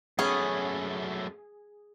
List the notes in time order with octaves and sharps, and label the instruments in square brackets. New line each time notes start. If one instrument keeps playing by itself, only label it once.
[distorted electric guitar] F#2 A3 [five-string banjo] B3 C#4 [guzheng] G#4